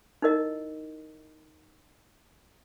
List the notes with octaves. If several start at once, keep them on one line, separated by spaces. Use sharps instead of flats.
D#4 E4 A#4 D#5